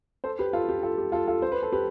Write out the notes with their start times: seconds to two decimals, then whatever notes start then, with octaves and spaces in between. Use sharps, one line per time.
0.24 A4 C5
0.39 G4 B4
0.53 F4 A4
0.69 G4
0.83 F4 A4
0.98 G4
1.12 F4 A4
1.27 F4 A4
1.42 C5
1.52 B4
1.62 A4
1.72 G4 B4